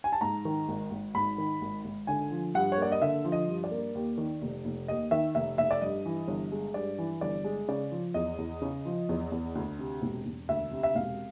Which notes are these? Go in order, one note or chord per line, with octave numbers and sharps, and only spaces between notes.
G#5
A5
G#2 A#5
D#3
G#1
G#1
G#2 B5
D#3
G#1
G#1
D3 G#5
F3
G2 F#5
C#5
A#3 D5
D#5
D3 E5
F3
D#5
G2
D5
A#3
D#2
D#3
F1
F1
D#2 D#5
D#3 E5
F1 E5
F1 E5
D5
G2 D#5
E3
G1
G#3
G2 D5
E3
G1 D5
G#3
C#3 D5
F3
E2 D#5
E2
C#3
F3
E2
E2
D2
C3
E1
E1
D2 E5
C3
E5
E1 F5